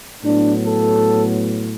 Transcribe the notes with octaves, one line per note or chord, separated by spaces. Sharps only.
A2 F#3 B3 D4
A4